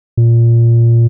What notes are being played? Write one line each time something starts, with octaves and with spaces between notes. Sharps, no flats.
A#2